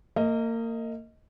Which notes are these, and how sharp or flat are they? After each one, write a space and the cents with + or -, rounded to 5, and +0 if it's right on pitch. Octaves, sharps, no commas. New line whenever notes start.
A#3 -30 D#5 +10